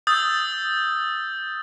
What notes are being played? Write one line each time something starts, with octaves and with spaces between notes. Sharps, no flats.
D#6 E6 G6 A6